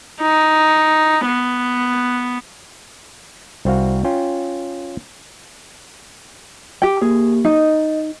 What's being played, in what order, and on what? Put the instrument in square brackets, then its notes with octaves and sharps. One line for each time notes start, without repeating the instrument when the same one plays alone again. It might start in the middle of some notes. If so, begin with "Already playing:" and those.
[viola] D#4
B3
[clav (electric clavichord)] C2 C4 F#4 F5
C#4 F4 G5
[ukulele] G4 G5
[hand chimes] A#3 G4 [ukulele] G#4
[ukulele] D#4 [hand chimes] D#5